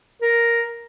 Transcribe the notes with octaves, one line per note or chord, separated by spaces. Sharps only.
A#4